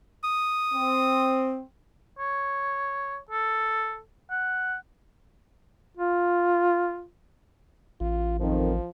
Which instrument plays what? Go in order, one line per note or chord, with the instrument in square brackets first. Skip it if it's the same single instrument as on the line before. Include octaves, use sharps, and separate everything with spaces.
[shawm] D#6
[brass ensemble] C4
[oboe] C#5
A4
F#5
[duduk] F4
[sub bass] A1 [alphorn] F4
[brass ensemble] F2 D#3 [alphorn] F3